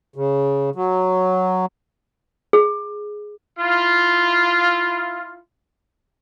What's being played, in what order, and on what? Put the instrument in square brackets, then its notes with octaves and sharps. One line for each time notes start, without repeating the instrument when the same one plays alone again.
[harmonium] C#3
F#3
[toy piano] G#4
[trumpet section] E4 F4